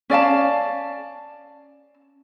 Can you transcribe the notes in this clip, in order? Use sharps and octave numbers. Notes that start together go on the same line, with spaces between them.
C#4 D5 F5 A5